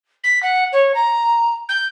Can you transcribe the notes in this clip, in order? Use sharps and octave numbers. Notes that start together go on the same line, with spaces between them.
B6
F#5
C#5
A#5
G6